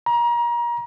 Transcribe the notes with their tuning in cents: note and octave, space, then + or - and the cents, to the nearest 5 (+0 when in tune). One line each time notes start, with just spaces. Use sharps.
A#5 +30